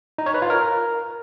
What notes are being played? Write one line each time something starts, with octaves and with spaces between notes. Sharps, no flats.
D#4
C#5
B4
F4
A#4